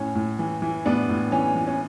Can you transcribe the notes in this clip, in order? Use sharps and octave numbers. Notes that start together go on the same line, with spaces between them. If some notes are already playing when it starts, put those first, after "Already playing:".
Already playing: A2 C#4
A2
E3
E3
A2 B3 D4
A2
E3 C#4
E3
C#4